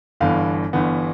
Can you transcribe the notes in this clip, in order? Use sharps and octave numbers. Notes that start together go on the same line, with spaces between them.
G1 G2 E3 B3 F5
G1 G2 E3 B3